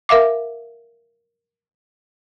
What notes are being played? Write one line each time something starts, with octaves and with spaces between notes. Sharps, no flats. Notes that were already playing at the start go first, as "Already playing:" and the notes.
A#4 E5 F5 D6